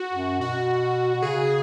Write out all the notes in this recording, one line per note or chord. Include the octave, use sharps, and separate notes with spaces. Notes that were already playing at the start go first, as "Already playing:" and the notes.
Already playing: F#4
F#2
B2 F#4
B2
C#3 G#4